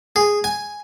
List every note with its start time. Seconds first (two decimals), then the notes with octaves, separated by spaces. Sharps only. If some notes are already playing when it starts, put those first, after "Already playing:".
0.16 G#4
0.44 G#5